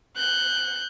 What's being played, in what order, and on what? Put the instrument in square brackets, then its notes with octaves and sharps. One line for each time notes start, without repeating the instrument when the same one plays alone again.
[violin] F#6 G6